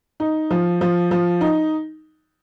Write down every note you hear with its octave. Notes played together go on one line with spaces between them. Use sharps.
D#4
F3
F3
F3
D#4